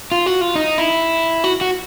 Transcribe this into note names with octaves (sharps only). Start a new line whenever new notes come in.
F4
F#4
F4
D#4
E4
F#4
F#4